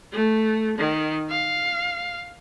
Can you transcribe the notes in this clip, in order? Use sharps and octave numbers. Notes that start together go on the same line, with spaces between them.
A3
D#3
F5